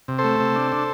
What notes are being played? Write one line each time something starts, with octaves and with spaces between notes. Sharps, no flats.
C3
A4 C5
A3
C3
D4
D4